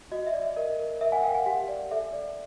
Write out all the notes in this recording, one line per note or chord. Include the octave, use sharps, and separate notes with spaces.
F#4 D#5
E5
D5
E5
A#4 D#5
A#4
A#4 E5
F#5 G#5
A#4 F5 G5
F#5 G#5
G4 F#5 G#5
D5
A4 E5
D5